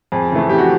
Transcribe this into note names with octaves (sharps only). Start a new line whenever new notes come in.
F2 G#4
C#3 E3 A3
F2 G4
F#4